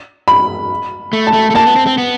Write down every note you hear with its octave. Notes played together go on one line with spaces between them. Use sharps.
B5
A3
A5
A3
A3
A#3 A5
B3
C4
C4
B3